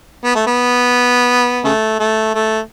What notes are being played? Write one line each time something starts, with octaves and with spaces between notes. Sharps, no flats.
B3
A3
B3
C#3 A3
A3
A3